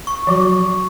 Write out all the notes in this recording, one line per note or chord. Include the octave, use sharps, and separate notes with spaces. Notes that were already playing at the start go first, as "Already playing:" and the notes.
C#6
F3 F#3 F#4